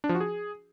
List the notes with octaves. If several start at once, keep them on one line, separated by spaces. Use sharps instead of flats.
D4
F3
F#4
G#4